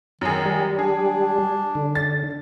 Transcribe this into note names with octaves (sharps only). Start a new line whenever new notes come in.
F#2 D#3 G#4
G3
D4 G#4
D3
A6